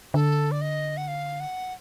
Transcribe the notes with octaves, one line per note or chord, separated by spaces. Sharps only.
D3 A4
D5
D#5
F#5
F5
F#5